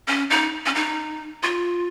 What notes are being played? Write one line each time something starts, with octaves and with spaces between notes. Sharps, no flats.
C#4
D#4
C#4
D#4
F4